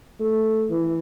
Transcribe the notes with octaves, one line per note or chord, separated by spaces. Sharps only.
A3
E3